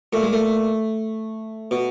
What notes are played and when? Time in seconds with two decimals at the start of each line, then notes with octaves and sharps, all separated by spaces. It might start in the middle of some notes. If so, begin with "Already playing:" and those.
0.13 A#2 A3
0.23 G#3
0.33 A3
1.71 B2